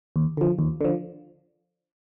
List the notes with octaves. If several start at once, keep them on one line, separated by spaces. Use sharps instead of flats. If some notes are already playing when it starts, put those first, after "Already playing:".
D#2
D3 F3
D#2
D3 F3